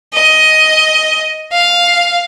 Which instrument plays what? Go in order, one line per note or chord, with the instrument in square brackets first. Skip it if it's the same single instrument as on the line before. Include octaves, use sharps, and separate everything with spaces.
[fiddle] D#5
F5